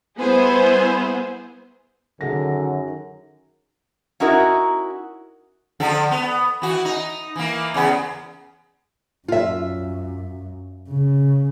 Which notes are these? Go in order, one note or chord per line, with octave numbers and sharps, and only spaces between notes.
G3 B3 E4 G#4 C5
F#2 D3 D#3 G#4 A#6
C#4 D#4 E4 F#4 A#4
D3 F3 A4
B3
E3 F#4
D#4
E3 A#3
E2 C#3 B3
F#2 F4 E5
C#3